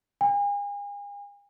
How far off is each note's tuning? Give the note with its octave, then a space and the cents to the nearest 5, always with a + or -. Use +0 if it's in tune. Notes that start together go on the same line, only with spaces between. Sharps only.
G#5 -40